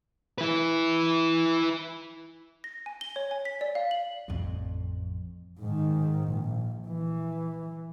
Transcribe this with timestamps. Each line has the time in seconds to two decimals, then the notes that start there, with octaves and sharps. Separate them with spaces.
0.38 E4 B4
2.64 A#6
2.86 G#5
3.01 G7
3.16 C#5
3.31 G#5
3.45 B6
3.61 D5
3.75 F5
3.91 F#7
4.28 A1 F2
5.60 G#2 D#3
6.28 A#1
6.88 E3